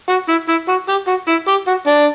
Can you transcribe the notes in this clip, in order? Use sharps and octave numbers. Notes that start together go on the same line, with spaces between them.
F#4
E4
E4
F#4
G4
F#4
E4
G4
F#4
D4